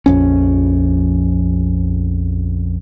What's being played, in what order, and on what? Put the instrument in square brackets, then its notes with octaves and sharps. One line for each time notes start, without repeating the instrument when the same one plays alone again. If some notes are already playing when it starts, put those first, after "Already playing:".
[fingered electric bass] A#1 F2 C#4